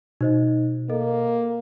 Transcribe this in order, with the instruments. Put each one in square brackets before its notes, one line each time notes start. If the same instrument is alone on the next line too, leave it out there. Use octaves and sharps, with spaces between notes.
[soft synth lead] B2 [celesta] D#4 C5 D#5
[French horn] A#3 [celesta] A4 D#5